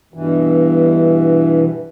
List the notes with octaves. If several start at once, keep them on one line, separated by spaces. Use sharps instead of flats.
G2 B2 E3